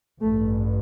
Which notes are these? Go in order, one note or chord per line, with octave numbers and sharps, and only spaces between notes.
A1 G2 A3